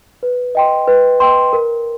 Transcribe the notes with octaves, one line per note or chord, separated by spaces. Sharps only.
B4
D#5 G5 C6
B4
D#5 G5 C6
A#4